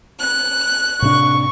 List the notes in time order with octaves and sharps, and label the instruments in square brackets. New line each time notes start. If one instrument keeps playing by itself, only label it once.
[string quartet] F#6
[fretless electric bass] A2 C3 D4 [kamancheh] C#6